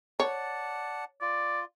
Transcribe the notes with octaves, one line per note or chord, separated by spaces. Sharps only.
C#5 D5 F#5 A5
F4 D5